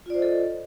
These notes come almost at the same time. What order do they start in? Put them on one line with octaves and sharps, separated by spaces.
F4 D5 C5 D#5 A4